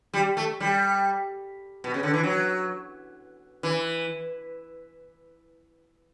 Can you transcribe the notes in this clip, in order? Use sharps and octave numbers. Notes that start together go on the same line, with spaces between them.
G3
A3
G3
B2
C#3
D3
E3
F#3
E3